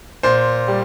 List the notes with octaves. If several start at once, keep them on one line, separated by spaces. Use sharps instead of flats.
A#2 C5
G3